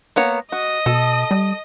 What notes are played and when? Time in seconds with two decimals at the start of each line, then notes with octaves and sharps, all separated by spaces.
0.16 A#3 B3 C#5
0.52 F#4 D#5 D#6
0.86 B2 A4
1.31 G3